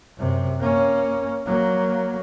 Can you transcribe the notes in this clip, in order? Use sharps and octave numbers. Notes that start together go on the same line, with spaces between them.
F#2 C3
A#3 C#4
F#3 A#3